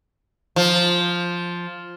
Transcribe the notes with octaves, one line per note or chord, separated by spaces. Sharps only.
F3